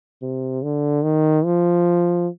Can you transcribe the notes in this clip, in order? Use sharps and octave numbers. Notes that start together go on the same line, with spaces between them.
C3
D3
D#3
F3